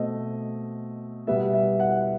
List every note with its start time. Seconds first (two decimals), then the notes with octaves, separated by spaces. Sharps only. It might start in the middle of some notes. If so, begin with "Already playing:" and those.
Already playing: B2 A3 C4 D#5
1.27 B2 G3 B3 E5
1.53 E5
1.80 F#5